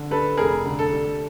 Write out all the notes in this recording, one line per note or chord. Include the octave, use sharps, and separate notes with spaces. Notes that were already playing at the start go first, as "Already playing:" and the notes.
Already playing: D3
G3 A4 B4
F1 G#4 A#4
D3
A4
G3